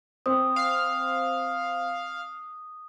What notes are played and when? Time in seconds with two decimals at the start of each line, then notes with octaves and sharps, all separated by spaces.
0.26 C4 D#6
0.56 F5